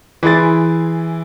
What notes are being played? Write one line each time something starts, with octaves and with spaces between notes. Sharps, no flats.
E3 E4 G#4 G#5 C6 A6